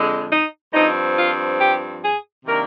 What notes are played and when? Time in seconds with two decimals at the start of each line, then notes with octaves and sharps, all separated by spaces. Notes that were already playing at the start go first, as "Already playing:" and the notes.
Already playing: F2 D3 G#3
0.31 D#4
0.74 G2 F3 C4 D#4
1.16 F4
1.60 G4
2.03 G#4
2.45 C3 D#3 A#3 D4 A#4